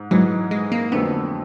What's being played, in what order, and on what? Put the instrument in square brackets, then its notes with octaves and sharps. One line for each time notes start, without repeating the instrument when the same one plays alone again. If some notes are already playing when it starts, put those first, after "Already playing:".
Already playing: [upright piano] G#2
[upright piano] G#2 E3 G#3 [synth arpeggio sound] F#3
[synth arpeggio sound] G#3
A#3
[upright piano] F2 D3 F#3 A3 [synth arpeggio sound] B3